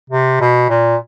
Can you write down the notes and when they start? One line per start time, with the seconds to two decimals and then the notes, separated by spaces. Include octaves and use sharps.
0.10 C3
0.41 B2
0.69 A#2